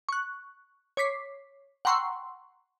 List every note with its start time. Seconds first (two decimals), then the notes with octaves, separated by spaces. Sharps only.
0.09 C#6 F#6
0.97 C#5 D6 B6 C7
1.85 F#5 G5 A#5 C6 C#6 E6